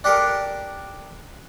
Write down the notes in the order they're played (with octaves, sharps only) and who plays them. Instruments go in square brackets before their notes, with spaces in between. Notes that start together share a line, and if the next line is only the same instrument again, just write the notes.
[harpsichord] D4 G4 A4 A#4